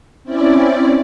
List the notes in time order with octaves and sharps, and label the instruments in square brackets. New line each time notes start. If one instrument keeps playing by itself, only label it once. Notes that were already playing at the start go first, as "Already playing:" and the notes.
[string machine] C4 C#4 E4 D5